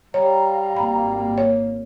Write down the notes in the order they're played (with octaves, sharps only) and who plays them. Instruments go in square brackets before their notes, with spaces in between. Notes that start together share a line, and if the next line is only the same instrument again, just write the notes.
[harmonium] G3 [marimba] C#5 [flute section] F5 A#5
[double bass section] G#1 A#3 [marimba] B5
[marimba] C#5